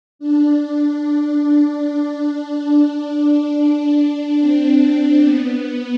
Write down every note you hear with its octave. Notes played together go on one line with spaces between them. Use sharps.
D4
D4
C4
B3
B3